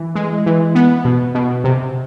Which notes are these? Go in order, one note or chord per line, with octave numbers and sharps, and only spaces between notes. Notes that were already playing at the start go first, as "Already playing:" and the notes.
Already playing: E3
G#3
E3
B3
B2
B2
C3